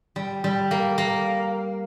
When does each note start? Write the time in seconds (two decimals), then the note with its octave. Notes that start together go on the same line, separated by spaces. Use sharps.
0.16 G3
0.44 G3
0.71 A#3
0.98 A#3